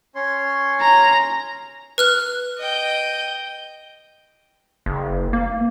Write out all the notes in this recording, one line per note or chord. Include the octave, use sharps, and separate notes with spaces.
C#4 C#5 C6
A#5
B4 F6 F#6
D#5 G5
F#1
A#3